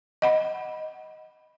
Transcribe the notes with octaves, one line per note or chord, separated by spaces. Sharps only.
D#5 F#5 B5